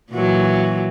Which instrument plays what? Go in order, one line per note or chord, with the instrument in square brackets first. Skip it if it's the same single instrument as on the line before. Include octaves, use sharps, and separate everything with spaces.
[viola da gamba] A#2 E3 F#3